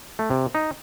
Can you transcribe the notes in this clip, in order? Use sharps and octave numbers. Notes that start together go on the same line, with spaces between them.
A3
C3
D#4